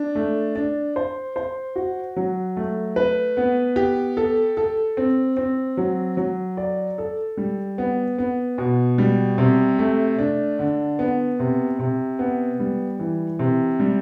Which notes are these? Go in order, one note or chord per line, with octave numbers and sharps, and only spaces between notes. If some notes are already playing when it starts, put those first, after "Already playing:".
Already playing: D4
A3
D4
C5
C5
F#4
F#3
A3
B4
B3
G4
A4
A4
C4
C4
F#3
F#3
D5
A4
G3
B3
B3
B2
G3
C3
A3
D4
D3
B3
C3
C3
B3
G3
E3
C3
G3